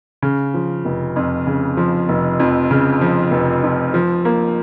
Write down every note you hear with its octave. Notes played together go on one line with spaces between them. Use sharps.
C#3
F3
F1
F2
C#3
F3
F1
F2
C#3
F3
F1
F2
F3
A#3